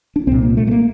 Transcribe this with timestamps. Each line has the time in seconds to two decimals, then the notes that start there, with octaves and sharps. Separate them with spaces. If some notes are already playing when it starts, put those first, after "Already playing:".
0.16 D4
0.27 C2 A#2 C4
0.42 A#3
0.57 A3
0.67 A3
0.71 A#3